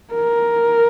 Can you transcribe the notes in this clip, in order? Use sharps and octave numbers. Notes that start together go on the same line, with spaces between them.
A#4